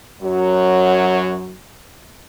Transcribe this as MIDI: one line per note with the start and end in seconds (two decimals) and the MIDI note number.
0.22 1.57 42
0.22 1.57 54